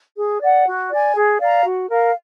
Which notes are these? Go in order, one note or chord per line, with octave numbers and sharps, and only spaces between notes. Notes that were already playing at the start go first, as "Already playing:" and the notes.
G#4
D5 F#5
F#4
D5 G#5
G#4
D5 F5 A#5
F#4
A#4 F5